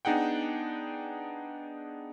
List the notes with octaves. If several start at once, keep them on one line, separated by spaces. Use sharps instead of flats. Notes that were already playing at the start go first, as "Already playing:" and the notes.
B3 D4 D#4 G#4 F#5 G5